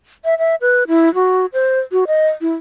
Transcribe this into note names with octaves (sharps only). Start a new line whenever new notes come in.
E5
E5
B4
E4
F#4
C5
F#4
D#5
E4